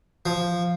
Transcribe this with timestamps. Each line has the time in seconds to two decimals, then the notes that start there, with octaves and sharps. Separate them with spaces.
0.26 F3